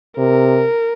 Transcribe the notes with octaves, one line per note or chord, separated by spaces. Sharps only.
C3 A#4